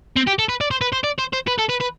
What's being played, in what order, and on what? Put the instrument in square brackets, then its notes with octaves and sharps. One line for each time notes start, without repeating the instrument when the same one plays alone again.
[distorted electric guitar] C4
G4
A4
B4
D5
C5
B4
C5
D5
C5
C5
B4
A4
B4
B4